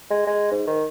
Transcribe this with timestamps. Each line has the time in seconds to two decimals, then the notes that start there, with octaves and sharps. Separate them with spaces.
0.11 G#3
0.27 G#3
0.52 G#2
0.67 D#3